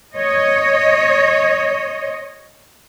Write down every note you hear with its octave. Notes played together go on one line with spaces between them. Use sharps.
C#5 D#5